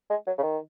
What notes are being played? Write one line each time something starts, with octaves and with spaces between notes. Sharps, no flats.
G#3
F#3
C#3
D#3